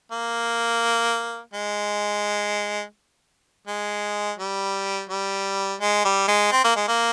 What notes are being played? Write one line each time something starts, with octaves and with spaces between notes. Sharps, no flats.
A#3
G#3
G#3
G3
G3
G#3
G3
G#3
C4
A#3
G#3
A#3